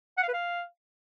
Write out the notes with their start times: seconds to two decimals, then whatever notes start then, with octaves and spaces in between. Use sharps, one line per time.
0.18 F#5
0.23 F5
0.28 B4
0.34 F5